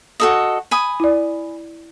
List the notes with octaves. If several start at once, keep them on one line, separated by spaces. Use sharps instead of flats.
F#4 A4 D#5
G#5 B5 D#6
E4 D5